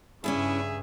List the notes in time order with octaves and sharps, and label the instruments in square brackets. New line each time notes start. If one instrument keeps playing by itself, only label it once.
[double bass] G2 C#3 [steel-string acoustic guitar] C#4 D4 E4 [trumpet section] G#4 E5